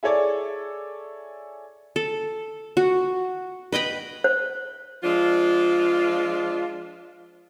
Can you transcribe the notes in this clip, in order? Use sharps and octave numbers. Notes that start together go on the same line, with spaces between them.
E4 G#4 A4 C#5 D5
A4
F#4
B4 D#5 G5 B5
C5
F3 G#3 D4 F4